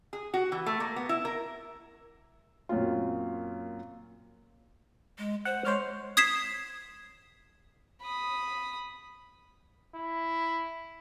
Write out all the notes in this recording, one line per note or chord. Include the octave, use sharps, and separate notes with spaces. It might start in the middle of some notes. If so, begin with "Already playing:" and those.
G#4
F#4
E3
A3
A#3
B3
E4
A#4
F#2 A#2 C4 F4
G#3
C5 F#5
G#3 C5 C#5 F6
D#6 G#6 B6 C7 E7
B5 D#6
E4